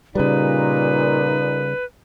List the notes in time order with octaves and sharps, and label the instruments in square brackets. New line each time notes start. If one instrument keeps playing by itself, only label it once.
[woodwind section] A#2 [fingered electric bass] C#3 G3 [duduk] D#4 [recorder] B4